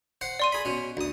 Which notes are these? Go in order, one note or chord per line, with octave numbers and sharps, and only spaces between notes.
C5 F#5
D5 C6 D#7
G#4 B5
B2 C#4
D2 D#6